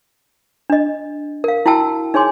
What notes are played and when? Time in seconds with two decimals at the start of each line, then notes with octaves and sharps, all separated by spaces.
0.70 D4 D#5
1.44 A#4 F5
1.66 E4 F#4 G5 A5 E6
2.14 D#4 G#4 C#5 G#5 C6 D6